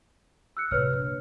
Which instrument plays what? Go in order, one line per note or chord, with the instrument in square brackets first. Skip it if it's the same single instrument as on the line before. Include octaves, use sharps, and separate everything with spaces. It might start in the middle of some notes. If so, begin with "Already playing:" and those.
[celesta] E6 F#6 C#7
[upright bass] A2 C3 [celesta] B4 C#5 F6
[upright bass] A#2 D3